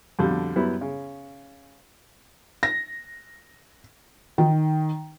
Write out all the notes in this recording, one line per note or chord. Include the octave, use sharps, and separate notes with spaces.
F2 B2 D3 G3
F#2 G3 B3 E4
C#3
A#6
D#3